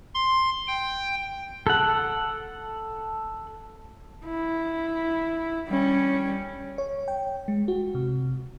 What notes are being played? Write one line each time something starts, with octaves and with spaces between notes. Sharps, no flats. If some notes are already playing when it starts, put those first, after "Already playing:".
C6
G5
A4 F#5
E4
G3 C#4
C#5
G5
G#3
F#4
C3